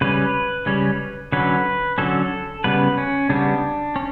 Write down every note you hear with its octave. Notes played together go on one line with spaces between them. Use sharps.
C#3 G3 C#4 B4
C#3 G3 C#4
D3 F#3 C#4 B4
D3 F#3 C#4 A4
C#3 G3 B3 B4
C#4
C#3 G3 B3 D4
C#4